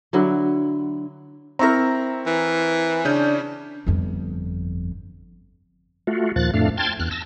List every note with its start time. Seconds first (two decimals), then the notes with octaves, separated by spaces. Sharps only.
0.13 D3 F#3 E4
1.59 C4 E4 A#4 A#5 C#6 A#6
2.26 E3
3.05 C#3 C#4 D4 G6
3.86 G1 F2
6.07 A3 F4 F#4
6.36 D#2 A#2 F3 F#6 A6
6.54 F2 A2 A3 D4 F5
6.77 G5 A5 C6 F6 G#6 A6
7.00 E2 F6 F#6
7.11 A5 E6 A#6